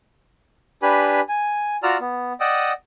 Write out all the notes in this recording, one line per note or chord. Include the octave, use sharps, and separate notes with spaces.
D4 G4 B4 G#5 B5
G#5
F4 F#4 D5 A#5 E6 F6
B3
D5 D#5 F#5 G5 D#6 E6